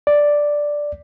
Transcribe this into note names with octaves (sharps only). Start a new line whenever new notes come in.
D5